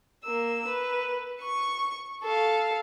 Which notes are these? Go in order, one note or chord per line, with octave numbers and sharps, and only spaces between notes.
A#3 E6
B4
C#6 C#7
A4 F5